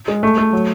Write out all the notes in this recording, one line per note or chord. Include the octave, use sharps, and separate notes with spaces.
G#3
A3
A3
F#3